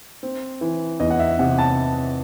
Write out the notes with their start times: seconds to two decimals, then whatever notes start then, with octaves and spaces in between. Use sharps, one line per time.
0.23 C4
0.61 E3
1.00 E2 D#5
1.10 F#5
1.19 E5
1.39 C3 F#5
1.58 A5